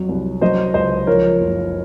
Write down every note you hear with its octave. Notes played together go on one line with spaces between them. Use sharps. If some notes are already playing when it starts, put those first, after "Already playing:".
Already playing: F2 F#3
C2
F#3 C5 D#5
C#2 C5 D#5
F3 A#4 C#5
F#1